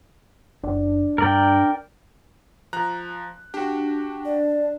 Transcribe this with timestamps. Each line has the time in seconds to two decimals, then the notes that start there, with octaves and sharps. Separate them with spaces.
0.63 F#1 D4
1.18 G2 A#4 D5 G5
2.73 F3 A#5 F#6
3.54 D4 F#4 G4
4.25 D5